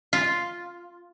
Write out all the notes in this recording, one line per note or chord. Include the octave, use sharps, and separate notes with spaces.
F4